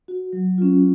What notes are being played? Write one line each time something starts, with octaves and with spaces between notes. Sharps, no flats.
F#4
F#3
C#4 F4